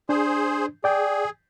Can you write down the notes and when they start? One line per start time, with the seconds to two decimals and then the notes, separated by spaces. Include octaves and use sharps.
0.09 D4 G#4 C5
0.84 G#4 D5 G5